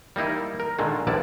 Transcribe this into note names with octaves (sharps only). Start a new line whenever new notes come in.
G3 A#3 D#4 E4
A#4
A#2 D3 D#3 G#3
A#1 G2 B3 E4 D5 A5